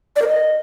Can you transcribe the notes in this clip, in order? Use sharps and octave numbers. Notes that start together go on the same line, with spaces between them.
D5
A#4
D#5